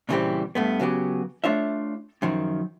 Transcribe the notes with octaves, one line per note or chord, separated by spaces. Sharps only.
A#2 C#3 E3 G3 C4 G4
G2 A3 B3
C#3 F#3 B3 G4
A3 D4 F4 C#5 E5
F#2 D#3 F3